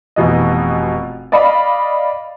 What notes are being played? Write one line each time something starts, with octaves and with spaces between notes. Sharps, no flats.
F1 B2 E3 D#5
D5 D#5 F5 B5